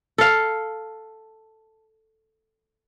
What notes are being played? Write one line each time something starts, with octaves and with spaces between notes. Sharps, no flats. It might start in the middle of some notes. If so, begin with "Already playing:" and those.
A4 F5